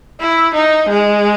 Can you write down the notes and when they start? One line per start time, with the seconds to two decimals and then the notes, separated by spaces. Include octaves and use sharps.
0.20 E4
0.54 D#4
0.89 G#3